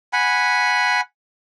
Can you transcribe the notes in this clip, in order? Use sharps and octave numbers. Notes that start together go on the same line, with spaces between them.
F#5 G#5 B5